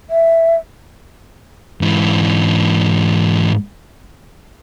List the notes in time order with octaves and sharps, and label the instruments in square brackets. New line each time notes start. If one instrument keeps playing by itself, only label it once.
[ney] E5
[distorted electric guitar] G#2 E3